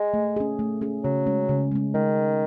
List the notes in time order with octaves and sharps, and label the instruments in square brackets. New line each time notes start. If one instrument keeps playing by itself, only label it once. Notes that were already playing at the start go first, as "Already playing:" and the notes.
Already playing: [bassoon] G#3
[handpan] A3
C#4 G#4
A3
C#4 G#4
[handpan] C#3 [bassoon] F#3
[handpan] G#3 C#4
C#3
G#3 C#4
[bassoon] D#3 [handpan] G#3